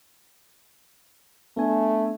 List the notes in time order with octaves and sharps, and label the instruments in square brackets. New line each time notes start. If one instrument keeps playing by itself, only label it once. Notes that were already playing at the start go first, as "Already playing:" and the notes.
[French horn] A3 [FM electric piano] B3 D4 G#5